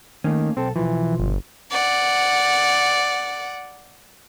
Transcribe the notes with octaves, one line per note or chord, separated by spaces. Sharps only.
D#3 A3 A#3 C#4
B1 C4 A4
B1 E3 F3
G1
D5 F#5